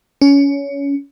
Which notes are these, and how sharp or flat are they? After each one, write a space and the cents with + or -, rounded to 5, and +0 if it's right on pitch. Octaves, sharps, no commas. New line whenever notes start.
C#4 +20